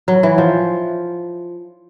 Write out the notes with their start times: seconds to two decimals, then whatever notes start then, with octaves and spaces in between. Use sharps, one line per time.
0.08 F#3
0.23 E3
0.38 F3